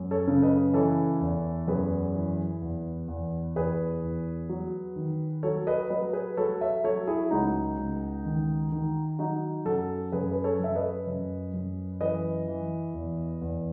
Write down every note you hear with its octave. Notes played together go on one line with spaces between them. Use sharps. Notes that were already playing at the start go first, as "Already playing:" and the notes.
Already playing: F#2
A4 C#5
C#3
B4 D#5
E3 A4 C#5
E2
F#2 G#4 B4
E3
E2
E2
E2 G#4 B4
E2
F#3
D#3
F#3 A4 C#5
B4 D#5
F#3 B4 D#5
G#4 B4
F#3 A4 C#5
C#5 E5
F#3 A4 C#5
E4 G#4
C#2 D#4 F#4
C#2
D#3
D#3
F#3 D#4 F#4
F#2 F#4 A4
F#2 G#4 B4
B4
A4 C#5
F#2 E5
B4 D#5
F#2
F#2
E3 B4 D#5
E3
E2
E2